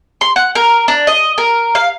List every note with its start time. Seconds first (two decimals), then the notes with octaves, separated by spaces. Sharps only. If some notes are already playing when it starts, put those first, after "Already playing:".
0.21 C6
0.36 F#5
0.55 A#4
0.88 D4
1.07 D#5
1.38 A#4
1.75 F5